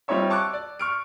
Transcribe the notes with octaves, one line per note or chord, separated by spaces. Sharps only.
G3 C4 D#4 F4 C#5 E5
A5 C#6 D6 E6 F#6
D5
C#6 F6 D7